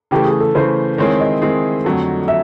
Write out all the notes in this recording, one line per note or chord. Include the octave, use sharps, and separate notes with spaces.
C#3 E3 A3 G4
G#4
A4
C#3 E3 A3 C5
D#3 G#3 C4 E4 G#4 C#5
D#5
D#3 G#3 C4 E4 G#4
F2 D3 F#3 A3
E5